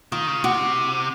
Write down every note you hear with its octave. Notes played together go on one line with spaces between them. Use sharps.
D#3 F4
C#3
C3 F#4